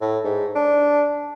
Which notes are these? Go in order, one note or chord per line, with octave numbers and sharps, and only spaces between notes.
A2
G#2
D4